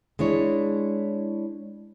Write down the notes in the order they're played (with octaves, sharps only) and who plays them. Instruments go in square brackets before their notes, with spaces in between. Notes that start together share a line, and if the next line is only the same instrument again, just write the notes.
[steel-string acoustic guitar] G#3 D4 E4 C#5